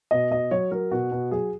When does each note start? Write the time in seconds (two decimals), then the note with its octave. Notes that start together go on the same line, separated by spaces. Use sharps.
0.11 B2 D#5
0.31 B2 D#5
0.51 F#3 C#5
0.71 F#3 A#4
0.91 B2 F#4
1.12 B2
1.31 F#3 G#4